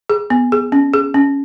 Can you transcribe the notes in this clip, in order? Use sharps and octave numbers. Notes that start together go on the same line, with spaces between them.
G#4
B3
G#4
C#4
G#4
C#4